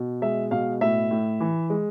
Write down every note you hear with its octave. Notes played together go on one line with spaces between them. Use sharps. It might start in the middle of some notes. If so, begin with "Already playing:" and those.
Already playing: B2
G#3 E5
B2 F5
A2 E5
A2
E3
G#3